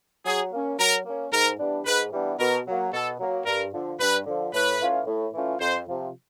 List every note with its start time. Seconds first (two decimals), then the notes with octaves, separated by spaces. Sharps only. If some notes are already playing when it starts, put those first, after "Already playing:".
0.25 F#3 G#4
0.52 A#3 C#4
0.78 F#3 A#4
1.05 A#3 C#4
1.32 G#2 A#4
1.59 E3 G3 B3 D4
1.85 G#2 B4
2.12 E3 G3 B3 D4
2.39 B2 A#4
2.66 F#3 A#3
2.92 B2 A4
3.19 F#3 A#3
3.46 G2 A#4
3.73 D3 F3
3.99 G2 B4
4.26 D3 F3
4.53 A2 B4
4.80 E3 A3 C#4 F4
5.06 A2
5.33 E3 A3 C#4 F4
5.60 F2 C5
5.87 C3 F3